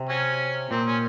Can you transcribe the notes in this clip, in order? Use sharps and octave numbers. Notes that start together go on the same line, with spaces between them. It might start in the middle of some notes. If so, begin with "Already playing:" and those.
Already playing: C3
F#3 C#4
A#2 C4
C#4